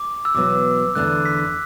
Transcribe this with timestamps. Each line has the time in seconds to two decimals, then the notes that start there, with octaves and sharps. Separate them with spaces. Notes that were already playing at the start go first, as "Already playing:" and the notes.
Already playing: D6
0.25 E6
0.34 E2 B2 F#3 B3 D6
0.95 E2 D3 A3 F#6
1.25 B6